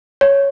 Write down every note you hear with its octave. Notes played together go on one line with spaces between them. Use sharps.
C#5